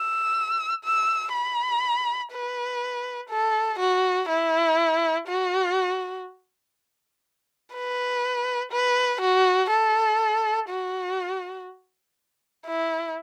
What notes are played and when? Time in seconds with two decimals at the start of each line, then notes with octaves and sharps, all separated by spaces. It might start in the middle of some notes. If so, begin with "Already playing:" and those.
Already playing: E6
0.85 E6
1.33 B5
2.32 B4
3.30 A4
3.80 F#4
4.29 E4
5.28 F#4
7.74 B4
8.72 B4
9.22 F#4
9.71 A4
10.70 F#4
12.67 E4